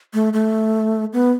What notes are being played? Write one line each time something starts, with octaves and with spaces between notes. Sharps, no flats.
A3
A3
B3